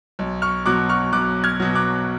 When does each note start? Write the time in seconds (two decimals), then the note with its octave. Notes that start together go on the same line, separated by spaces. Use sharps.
0.19 B1
0.42 C#6 F6
0.66 B2 F#3 D6 F#6
0.89 C#6 F6
1.12 B1 D6 F#6
1.44 F6 G#6
1.60 B2 F#3
1.75 D6 F#6